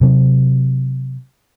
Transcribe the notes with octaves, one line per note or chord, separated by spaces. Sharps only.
C3 F#3 C4